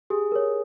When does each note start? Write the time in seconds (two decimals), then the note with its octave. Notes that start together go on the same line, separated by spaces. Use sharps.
0.10 G4 G#4
0.32 A#4 C#5